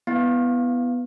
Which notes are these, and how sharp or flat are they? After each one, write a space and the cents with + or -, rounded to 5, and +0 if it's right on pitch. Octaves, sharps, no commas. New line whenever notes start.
B3 +0 E4 +0 F5 +0